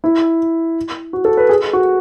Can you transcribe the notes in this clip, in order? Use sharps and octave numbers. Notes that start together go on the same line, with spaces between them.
E4
F#4
A4
B4
G#4
F#4